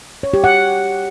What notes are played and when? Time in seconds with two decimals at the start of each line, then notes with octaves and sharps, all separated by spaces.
0.23 C#5
0.34 G4
0.44 F#5